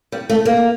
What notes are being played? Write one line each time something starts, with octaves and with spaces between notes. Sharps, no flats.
G3
A3
A#3